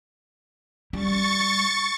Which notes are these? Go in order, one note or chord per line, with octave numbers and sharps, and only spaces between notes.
G3 C#6 A6